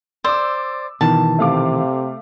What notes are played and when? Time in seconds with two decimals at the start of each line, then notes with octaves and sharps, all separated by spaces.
0.24 C5 D5 D6 E6
1.01 B2 D#3 E3 A5
1.38 C3 A3 F5 D6